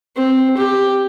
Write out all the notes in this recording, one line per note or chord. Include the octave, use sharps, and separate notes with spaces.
C4
G4